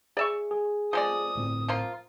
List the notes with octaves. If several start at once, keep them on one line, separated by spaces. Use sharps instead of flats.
G#4 D5 E5 C#6
G#4
F3 G#3 D5 D#6
G1 A2 C4
F3 A#3 F4